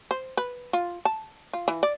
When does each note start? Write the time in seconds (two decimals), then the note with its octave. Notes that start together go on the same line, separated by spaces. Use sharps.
0.11 C5
0.37 B4
0.73 F4
1.05 A5
1.53 F4
1.68 E3
1.83 D5